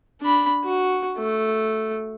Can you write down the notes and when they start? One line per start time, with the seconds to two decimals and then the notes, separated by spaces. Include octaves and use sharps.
0.22 D4 B5
0.64 F#4
1.18 A3